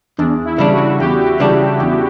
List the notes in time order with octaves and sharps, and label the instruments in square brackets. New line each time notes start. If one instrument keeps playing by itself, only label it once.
[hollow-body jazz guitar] E2 [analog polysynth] D4
[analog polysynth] E4
[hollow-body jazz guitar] C#3 G3 D4
[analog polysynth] F#4
[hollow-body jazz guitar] E2 [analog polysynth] G4
[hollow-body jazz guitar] C#3 G3 D4
E2